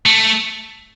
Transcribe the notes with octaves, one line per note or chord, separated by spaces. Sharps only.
A3